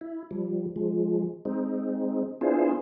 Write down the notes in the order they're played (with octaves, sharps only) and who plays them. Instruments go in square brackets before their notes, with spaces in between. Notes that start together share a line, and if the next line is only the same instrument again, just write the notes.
[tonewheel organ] E4
F3 G3
F3 G#3
G#3 C4 D#4
B3 D4 E4 F4 G#4 C5